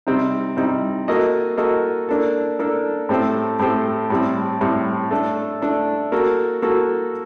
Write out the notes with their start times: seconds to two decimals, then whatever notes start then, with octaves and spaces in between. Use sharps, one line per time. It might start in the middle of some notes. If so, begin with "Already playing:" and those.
0.07 C3 G3 C4 D#4
0.57 C3 G3 C4 D#4
1.08 A#3 F#4 A4 D#5
1.57 A#3 F#4 A4 D#5
2.09 A#3 D4 A4
2.59 A#3 D4 A4
3.09 A2 A3 C4 G4 C5
3.59 A2 A3 C4 G4 C5
4.10 A2 G3 C4
4.61 A2 G3 C4
5.11 A3 D4 A4
5.62 A3 D4 A4
6.12 A#3 F#4 A4
6.62 A#3 F#4 A4